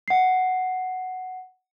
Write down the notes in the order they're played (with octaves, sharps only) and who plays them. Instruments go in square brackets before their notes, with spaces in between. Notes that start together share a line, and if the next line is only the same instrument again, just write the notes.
[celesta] F#5 C7